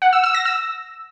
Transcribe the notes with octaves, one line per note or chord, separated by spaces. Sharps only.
F#5
E6
E6
A#6
E6